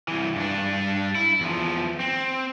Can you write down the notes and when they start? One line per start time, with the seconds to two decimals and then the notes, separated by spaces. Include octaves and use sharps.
0.08 C2 E3
0.36 G2 D4
1.15 E4
1.41 E2 F3
2.00 C4